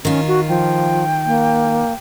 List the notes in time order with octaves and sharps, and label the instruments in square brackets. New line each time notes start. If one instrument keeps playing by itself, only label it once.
[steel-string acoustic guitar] D#3 F4 [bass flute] C#4
[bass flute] F#4
[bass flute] F3 [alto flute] G5
[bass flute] A#3